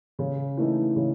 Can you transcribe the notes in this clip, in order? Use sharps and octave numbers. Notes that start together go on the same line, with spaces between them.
C#3
E3 A3 D#4
C#3